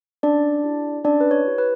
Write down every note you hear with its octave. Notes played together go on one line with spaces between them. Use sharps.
C#4 D4 D5
E4 G4
C#4 D4 D5
B4
C#5
E4 G4
B4